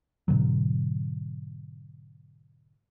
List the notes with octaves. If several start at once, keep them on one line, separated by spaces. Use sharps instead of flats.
G#2 B2 D3 F#3